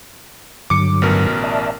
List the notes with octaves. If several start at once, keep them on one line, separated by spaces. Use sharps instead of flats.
G2 D3 F#3 D6 C#7
A1 B2 A#4
D5 E5 A5